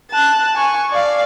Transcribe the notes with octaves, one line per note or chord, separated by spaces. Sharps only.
A5 F#6
G#5 C#6
D5 F5